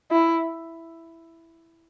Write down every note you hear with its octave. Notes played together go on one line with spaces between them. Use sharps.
E4